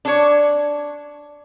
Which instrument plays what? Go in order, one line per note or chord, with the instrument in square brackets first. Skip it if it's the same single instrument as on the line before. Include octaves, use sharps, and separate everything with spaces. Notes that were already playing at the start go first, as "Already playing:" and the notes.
[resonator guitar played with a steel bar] D4 C#5